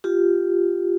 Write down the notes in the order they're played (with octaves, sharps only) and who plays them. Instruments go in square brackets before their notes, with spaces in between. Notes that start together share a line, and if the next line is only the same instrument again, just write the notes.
[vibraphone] F4 G4